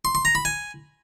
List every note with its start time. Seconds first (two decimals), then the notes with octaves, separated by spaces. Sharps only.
0.05 C6
0.15 C6
0.25 A#5
0.35 B5
0.45 G#5